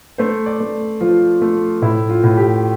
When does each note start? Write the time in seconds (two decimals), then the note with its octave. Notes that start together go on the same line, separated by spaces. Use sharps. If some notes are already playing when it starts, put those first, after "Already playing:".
0.18 A3 C5
0.46 D5
0.60 A3
1.01 F3 F4
1.42 A3
1.82 A2 E4
2.09 F4
2.24 A2
2.37 G4